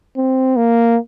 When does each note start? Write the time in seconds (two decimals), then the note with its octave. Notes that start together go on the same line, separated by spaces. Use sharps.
0.17 C4
0.56 A#3